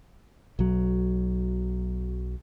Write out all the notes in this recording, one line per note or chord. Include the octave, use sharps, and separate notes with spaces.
B1 F#3